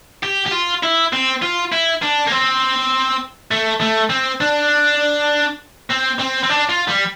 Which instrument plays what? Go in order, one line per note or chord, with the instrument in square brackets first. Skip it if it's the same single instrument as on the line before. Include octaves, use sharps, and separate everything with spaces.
[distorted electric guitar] G4
G4
F4
E4
C4
F4
E4
D4
A#3
C4
A3
A3
C4
D4
C4
C4
C4
D4
F4
G3